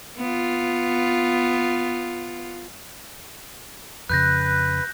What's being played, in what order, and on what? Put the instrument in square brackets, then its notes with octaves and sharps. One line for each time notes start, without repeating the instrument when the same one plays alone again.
[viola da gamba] B3 F4
[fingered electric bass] F2 C#3 [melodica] B4 [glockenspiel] F#6 G6 A#6